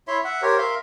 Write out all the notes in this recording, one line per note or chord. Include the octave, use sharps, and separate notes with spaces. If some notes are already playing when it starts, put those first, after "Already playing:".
E4 C#5 E5 C6
E5 F#5
G4 A#4 C5 C#5
A#4 E5 F5 C6